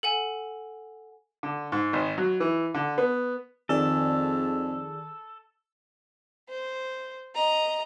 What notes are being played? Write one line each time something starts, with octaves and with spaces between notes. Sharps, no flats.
A4 F#5 G#5
D3
G#2
G#1
F#3
E3
D3
B3
F2 D#3 G#4 A4 D5
C5
D#5 A#5